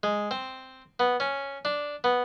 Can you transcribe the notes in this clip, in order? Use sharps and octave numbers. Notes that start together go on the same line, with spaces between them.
G#3
C4
B3
C#4
D4
B3